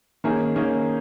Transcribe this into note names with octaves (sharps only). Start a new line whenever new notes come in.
D#3 A#3 C#4 G#4
D#3 A#3 C#4 G#4